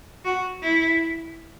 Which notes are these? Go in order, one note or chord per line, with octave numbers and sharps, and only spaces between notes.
F#4
E4